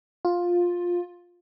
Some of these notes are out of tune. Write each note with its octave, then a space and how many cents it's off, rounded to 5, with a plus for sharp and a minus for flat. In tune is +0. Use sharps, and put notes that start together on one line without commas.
F4 +10